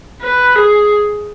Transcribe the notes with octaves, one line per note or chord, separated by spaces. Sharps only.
B4
G#4